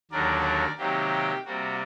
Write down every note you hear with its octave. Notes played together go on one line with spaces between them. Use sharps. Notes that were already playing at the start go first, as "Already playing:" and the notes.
D#2 D3 F#3 A#3 A#4 D5
C3 D#3 F#3 A#3 G4
C3 G3 A#3 F#4